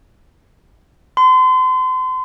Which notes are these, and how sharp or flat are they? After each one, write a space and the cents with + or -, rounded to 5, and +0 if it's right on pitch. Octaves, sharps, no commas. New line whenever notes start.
C6 -35